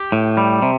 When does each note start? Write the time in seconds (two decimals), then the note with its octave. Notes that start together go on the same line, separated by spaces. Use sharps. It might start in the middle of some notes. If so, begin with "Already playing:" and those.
Already playing: G4
0.12 A2
0.37 G3
0.62 C3